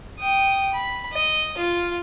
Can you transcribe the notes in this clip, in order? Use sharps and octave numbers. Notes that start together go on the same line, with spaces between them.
G5 D#6
B5
D#5
F4